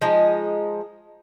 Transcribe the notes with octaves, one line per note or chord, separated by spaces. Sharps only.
F3 G#3 D#4